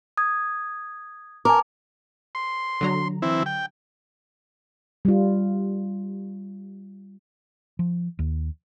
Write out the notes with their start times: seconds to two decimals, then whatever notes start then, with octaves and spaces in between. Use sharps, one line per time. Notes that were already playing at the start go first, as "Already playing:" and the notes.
0.17 D#6 G#6
1.45 A#4 G#5 A5 D6
2.35 C6
2.81 D3 F#3 A#5
3.22 E3 C4 E4
3.46 G5
5.05 G3 F4
7.79 F3
8.19 D#2